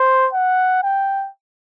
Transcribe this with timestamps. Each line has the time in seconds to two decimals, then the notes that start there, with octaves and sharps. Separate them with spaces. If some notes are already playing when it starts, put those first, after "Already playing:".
Already playing: C5
0.34 F#5
0.83 G5